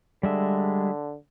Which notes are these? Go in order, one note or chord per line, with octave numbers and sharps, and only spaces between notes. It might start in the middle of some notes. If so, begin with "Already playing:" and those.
D3 G3 G#3 E5